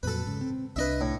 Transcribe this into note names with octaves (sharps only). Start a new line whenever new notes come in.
F2 A#2 F#3 A4 B4
G#2 C#3
C4
C2 C#4 D4 B4 D#5 E5
A2